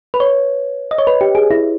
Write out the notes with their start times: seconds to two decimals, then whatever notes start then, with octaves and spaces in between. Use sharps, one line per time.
0.14 B4
0.20 C#5
0.91 D#5
0.98 C#5
1.07 B4
1.21 G4
1.35 G#4
1.51 E4